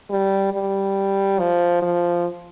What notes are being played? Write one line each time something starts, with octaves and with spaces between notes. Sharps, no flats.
G3
G3
F3
F3